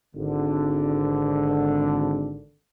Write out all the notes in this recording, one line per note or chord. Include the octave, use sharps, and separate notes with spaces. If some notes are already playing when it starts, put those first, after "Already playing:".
G#1 D3